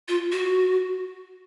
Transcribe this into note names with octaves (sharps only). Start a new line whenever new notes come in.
F4
F#4